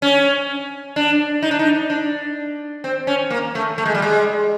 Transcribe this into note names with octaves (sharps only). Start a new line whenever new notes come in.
C#4
D4
D#4
D4
D#4
D4
C4
C#4
A#3
A3
A3
G#3
G3
G#3